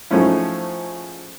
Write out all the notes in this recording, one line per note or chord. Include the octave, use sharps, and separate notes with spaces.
G#2 F3 A3 C#4 E4